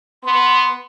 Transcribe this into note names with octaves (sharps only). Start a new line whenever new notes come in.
B3 C6